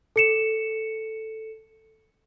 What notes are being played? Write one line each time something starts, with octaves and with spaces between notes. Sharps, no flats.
A4 C#7 E7